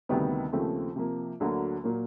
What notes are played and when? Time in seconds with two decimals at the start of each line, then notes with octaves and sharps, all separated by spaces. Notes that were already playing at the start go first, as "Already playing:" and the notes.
0.09 D2 C3 D#3 G3 B3
0.53 D#2 C#3 F3 A3 C4
0.96 C3 F3 A#3
1.40 D2 D3 F#3 A#3
1.84 A#2 F#3 A#3